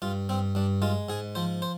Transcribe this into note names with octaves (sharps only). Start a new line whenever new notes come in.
G2 F4
G2 C4
G2 D4
G#3 F4
G#2 G#4
F3 C5
C5